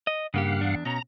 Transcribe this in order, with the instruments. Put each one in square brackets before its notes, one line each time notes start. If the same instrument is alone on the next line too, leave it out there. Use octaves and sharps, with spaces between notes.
[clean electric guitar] D#5
[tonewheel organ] G2 F5 F#5 [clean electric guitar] C#3 A#3 G4
[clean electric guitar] E2 D4
[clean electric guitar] B2 C#4 [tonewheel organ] A#5